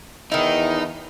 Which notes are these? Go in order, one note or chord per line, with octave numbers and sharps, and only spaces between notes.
E2 D#3 D#4 E4